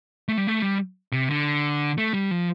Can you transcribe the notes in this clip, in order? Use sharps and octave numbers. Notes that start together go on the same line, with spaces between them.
A3
G3
A3
G3
C3
D3
A3
G3
F3